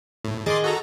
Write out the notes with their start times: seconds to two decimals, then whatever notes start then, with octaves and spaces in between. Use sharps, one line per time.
0.24 A2
0.46 D#3 G#4 D#5 C6 D6 A6
0.64 F#4 A4 A#5